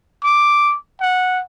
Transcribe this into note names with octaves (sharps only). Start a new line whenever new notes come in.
D6
F#5